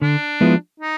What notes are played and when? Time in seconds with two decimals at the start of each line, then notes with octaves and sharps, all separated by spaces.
0.02 D3 D4
0.41 F3 G#3 B3 E4
0.80 D#4